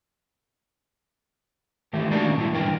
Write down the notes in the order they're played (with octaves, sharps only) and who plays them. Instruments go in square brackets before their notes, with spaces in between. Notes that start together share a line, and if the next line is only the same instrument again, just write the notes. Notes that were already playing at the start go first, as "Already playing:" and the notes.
[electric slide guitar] D#3 E3 A3 G4 A4
G#3 A#3 D4 D#4 F#4 A#4
D#3 A#3 C#4
A#2 G3 E4
G2 D3 E3 A#4 G5